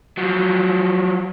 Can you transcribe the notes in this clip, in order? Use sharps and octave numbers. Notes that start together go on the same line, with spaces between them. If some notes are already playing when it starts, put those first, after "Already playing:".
F3 F#3